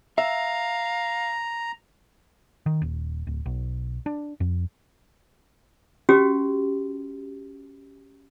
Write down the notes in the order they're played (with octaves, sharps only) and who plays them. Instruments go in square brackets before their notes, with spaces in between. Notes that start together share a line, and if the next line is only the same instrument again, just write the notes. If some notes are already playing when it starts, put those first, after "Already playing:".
[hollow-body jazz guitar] E5 [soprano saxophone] F5 [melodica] A#5
[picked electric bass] D#3
D#1
D1
B1
D4
F2
[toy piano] C#4 F#4 G4